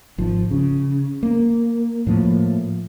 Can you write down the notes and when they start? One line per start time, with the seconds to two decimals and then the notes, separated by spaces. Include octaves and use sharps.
0.18 G#1 F3
0.51 C#3
1.23 A#3
2.07 A2 F3 A#3